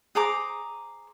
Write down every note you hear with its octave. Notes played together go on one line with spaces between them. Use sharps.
G#4 C5 A#5 D6